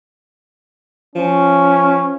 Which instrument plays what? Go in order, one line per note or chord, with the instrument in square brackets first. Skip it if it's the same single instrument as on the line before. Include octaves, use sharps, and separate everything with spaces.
[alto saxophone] F3 [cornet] C#4